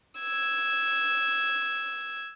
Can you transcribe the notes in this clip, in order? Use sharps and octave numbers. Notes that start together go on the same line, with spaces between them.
E6 G#6